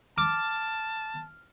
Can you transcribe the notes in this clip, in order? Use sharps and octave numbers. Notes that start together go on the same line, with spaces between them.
A5 D6 F6